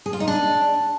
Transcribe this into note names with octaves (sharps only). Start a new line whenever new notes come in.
G#4
F4
D#4
D4